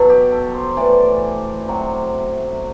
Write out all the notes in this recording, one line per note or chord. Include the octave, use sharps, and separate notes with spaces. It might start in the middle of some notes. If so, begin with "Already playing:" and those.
Already playing: B2 F#3 A4
G4
A4
C5
A2 E3 D5
C3 F#3